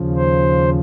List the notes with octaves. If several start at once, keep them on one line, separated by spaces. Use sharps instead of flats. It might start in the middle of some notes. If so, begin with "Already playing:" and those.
Already playing: D#2 C#3 F3
C5